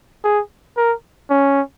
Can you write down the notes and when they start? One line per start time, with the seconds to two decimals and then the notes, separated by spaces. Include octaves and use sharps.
0.24 G#4
0.77 A#4
1.30 C#4